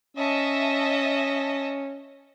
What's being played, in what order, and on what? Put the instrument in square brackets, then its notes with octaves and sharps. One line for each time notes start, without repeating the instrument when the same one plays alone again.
[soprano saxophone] C#4 [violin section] D#5 E5 A5